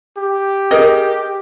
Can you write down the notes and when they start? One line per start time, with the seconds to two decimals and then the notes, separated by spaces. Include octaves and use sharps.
0.17 G4
0.71 G#4 A#4 D#5